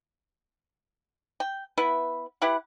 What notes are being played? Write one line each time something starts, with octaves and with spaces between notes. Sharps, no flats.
G5
B3 E4 B4 E5
E4 G4 B4 F#5